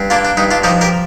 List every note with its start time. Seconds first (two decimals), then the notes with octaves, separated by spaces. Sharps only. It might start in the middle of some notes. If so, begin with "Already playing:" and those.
Already playing: G2
0.10 A#3 D4 F4
0.25 D4
0.37 G2 D#4
0.51 D4 F4
0.63 F3 D#4 G4
0.81 G4 A#4